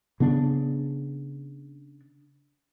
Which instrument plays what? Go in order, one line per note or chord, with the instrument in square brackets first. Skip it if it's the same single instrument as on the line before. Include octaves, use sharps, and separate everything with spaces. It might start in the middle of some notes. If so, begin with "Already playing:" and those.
[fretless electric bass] C#3 B3 D4